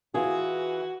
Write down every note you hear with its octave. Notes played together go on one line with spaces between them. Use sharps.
E3 F4 F#4 G#4